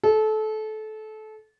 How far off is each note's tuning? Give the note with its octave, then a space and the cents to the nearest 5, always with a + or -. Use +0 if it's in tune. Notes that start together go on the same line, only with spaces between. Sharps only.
A4 -25